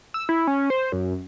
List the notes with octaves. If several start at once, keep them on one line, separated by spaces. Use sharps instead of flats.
E6
E4
C#4
C5
F#2